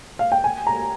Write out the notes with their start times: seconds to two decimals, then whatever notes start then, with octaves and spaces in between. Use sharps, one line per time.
0.19 F5
0.32 G5
0.44 G#5
0.67 A#5